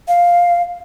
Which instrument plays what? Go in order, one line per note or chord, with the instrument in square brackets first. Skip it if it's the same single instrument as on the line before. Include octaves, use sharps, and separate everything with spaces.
[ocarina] F5